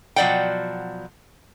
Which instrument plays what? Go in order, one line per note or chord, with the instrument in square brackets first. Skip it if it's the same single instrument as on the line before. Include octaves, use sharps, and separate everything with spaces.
[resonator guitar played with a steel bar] B2 F3 F#3 D5 F#5 G5